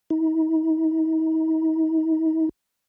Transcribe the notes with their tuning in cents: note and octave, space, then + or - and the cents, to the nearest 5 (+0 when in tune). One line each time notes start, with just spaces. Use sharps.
D#4 +45